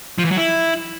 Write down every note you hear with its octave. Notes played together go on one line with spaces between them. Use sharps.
F3
E3
F#3
E4